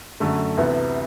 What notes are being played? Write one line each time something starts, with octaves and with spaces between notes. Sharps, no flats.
F#2 D3 A3
D2 C3 E3 B3